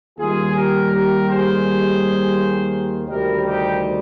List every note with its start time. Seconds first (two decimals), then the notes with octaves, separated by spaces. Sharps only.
0.18 D#2 D#3 G3 F4 G#4
0.55 G4 A#4
0.91 G4 A#4
1.28 G#4 C5
3.08 D2 C3 D#3 G3 G4 A#4
3.44 D#4 G4